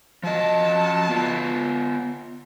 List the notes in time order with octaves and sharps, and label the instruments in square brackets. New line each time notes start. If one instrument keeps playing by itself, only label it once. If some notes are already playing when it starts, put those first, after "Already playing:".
[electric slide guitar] F3 D#5 [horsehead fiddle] F#3 A5
[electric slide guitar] B3 F4